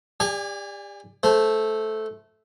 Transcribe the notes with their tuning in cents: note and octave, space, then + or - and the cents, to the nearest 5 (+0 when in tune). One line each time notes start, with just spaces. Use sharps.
G4 +35 D5 +0 G#5 -25
A3 -10 C5 +0